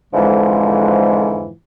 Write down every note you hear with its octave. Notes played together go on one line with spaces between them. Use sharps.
F2 G#2 D3 E3 F3 G#3